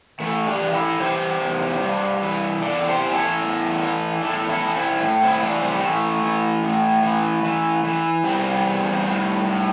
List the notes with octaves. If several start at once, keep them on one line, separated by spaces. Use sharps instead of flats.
E3 A3
D4 G4
E3
E4 A4
E3 G4 C5
E2
G2
E3
E2 A4 D5
G4 C5
E3
E4 A4
E2
E3
E2 E4 A4
E4 A4
E3
C4 E4
A2
C4 E4
E3 A3 D4
G3 C4
C4
E3 A3
E3
A2
E3
E3
E3
E2 G3 C4
E2
A2
A2